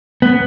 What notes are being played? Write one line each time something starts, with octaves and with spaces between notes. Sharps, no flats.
B3